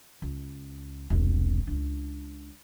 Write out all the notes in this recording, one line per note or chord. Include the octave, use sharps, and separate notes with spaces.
C#2
E1 C2
C#2 D4